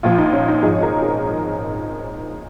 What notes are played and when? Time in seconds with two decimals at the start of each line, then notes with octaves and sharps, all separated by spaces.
0.03 A#1 A#2 F3 F4
0.18 D#4
0.33 C#4
0.48 D#4
0.62 G#1 G#2 F3 G#4
0.73 C#5
0.83 A#4
1.02 G#4